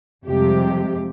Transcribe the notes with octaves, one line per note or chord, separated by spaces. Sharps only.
F2 C3 G3 G#3 G4